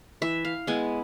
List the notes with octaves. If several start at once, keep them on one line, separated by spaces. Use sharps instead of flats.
E3 E5
F5
G#3 B3 E4 G#5